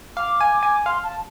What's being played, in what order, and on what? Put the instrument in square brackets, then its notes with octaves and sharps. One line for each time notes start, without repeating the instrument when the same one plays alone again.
[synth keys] F5 [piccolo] D6
[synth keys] G#5
[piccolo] D6
[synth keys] G#5
[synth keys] F5 [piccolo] C6
[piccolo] A5